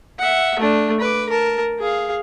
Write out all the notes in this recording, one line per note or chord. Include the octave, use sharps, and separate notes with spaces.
E5 F#5
A3 D4
B4 D6
A#4 A5
G#4 F5